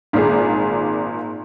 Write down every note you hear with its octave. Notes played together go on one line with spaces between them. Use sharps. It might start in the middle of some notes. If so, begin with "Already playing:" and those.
G#1 A#2 G#4